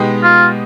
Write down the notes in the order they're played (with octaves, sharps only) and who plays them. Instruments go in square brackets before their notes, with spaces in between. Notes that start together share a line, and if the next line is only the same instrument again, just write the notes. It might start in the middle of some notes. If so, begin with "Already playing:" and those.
Already playing: [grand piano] B2 G#3 B3 D#4 G4
[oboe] F4